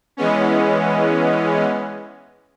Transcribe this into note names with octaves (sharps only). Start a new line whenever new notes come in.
E3 G#3 B3 C#4